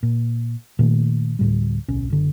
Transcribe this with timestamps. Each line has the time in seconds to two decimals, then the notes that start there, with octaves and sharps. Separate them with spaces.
0.03 A#2
0.79 A#2 D#3 F#3 A3
1.39 D2 A2 G3
1.88 D1 B1 C#4
2.10 F#1 D3